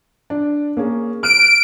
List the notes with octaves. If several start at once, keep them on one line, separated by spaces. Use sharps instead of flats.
D4
A#3 C#4 G#4
F6 F#6 D7 D#7